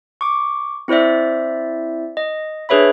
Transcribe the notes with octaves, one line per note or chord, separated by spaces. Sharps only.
C#6 D6
C4 E4 C5 D5 E5
D#5
D4 G#4 B4 C#5 E5 B5